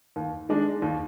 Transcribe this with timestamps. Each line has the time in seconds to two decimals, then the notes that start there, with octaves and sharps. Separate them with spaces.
0.16 D#2
0.49 D#3 G#3 D4
0.82 D#2